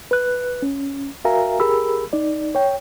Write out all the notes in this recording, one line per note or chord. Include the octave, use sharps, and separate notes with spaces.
B4 F#6
C#4
F#4 A#4 E5 F5 G#5 A#5
G4 G#4 A#4 B5 E6
D#4 D5
C#5 G5